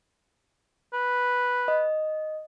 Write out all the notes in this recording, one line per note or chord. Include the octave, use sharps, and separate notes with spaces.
B4
D#5